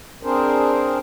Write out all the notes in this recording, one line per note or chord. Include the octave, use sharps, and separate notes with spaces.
C4 D4 G#4 A#4 C5